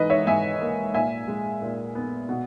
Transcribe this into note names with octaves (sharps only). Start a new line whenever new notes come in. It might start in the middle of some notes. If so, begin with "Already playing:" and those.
Already playing: G#2 E3 B4 D#5
C#5 E5
G#2 E5 G#5
A#3
A#2 E5 G#5
G#3
A#2
B3
B2